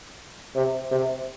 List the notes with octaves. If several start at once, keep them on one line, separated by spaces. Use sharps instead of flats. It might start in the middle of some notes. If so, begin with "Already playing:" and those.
C3
C3